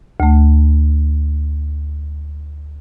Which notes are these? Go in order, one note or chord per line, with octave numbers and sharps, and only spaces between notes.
D2 A3